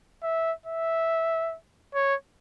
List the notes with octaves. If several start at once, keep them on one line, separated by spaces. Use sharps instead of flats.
E5
E5
C#5